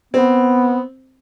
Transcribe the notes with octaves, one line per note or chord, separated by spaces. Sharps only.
B3 C4